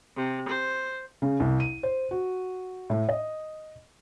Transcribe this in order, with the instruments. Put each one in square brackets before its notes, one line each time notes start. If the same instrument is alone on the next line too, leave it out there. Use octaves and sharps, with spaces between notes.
[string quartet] C3
C5
[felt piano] C#3
C2
D#7
C5
F#4
A2
D#5